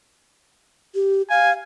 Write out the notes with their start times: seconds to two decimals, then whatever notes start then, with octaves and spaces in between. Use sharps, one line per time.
0.95 G4
1.30 F5 G#5